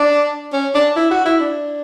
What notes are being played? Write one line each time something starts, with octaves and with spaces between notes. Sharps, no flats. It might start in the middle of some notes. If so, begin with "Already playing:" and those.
Already playing: D4
C#4
D4
E4
F#4
E4
D4